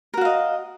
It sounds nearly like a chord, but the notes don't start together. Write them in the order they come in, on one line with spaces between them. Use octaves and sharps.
A#4 F#4 F5 D#5